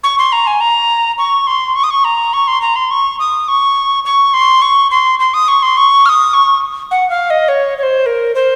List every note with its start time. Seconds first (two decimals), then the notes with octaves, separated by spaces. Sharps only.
0.04 C#6
0.18 C6
0.32 A#5
0.47 G#5
0.61 A#5
1.18 C#6
1.47 C6
1.76 C#6
1.84 D#6
1.91 C#6
2.04 A#5
2.33 C#6
2.48 C6
2.62 A#5
2.76 C6
2.91 C#6
3.19 D#6
3.48 C#6
4.05 C#6
4.34 C6
4.62 C#6
4.91 C6
5.20 C6
5.34 D#6
5.48 C#6
5.63 C6
5.77 C#6
6.06 F6
6.09 D#6
6.34 C#6
6.91 F#5
7.10 F5
7.30 D#5
7.48 C#5
7.78 C#5
7.83 C5
8.06 A#4
8.35 C5